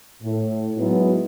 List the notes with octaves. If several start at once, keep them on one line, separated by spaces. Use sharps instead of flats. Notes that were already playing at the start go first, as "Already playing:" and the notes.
A2
F#3 G#3 B3 D#4 E4 F#4